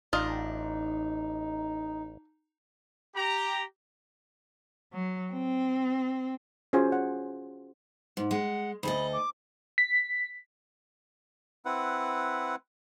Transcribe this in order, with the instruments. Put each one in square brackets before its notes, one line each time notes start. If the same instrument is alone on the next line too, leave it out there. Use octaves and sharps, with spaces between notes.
[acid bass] A1 [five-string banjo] D4 F4 D#5 [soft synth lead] D#4
[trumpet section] G4 A#5
[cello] F#3
C4
[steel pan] C#4 F4 F#4 G#4 C5 G#5
F#5
[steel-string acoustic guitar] G#2
[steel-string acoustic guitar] G#3 [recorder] F#5
[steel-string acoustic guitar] D2 A4 D#5 [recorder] B5
[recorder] D6
[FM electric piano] B6
[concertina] C4 E4 B4 F#5